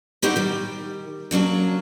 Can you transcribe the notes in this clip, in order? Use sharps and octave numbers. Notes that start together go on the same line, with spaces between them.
D#4 E4 F#4 G4 C5
D#3 G3
C#3 F#3 A#3 D4